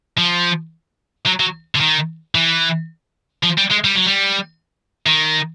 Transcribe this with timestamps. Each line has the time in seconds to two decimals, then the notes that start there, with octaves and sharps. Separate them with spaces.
0.18 F3
1.26 F#3
1.40 F#3
1.75 D3
1.81 D#3
2.35 E3
3.43 F3
3.58 G3
3.71 G#3
3.84 G3
3.95 F#3
4.06 G3
5.07 D#3